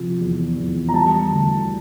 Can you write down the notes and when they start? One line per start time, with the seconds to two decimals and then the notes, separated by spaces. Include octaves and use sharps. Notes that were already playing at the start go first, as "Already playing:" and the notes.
Already playing: C3 F3
0.21 E2
0.57 E2
0.89 A#5
0.94 G3 A5
1.31 D2